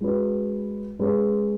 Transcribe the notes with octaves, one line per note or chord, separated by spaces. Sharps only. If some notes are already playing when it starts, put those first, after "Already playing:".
G#3 C#4 F#4 B4
G#3 C#4 G#4 B4